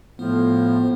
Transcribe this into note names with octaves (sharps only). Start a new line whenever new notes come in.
A2 F3 B3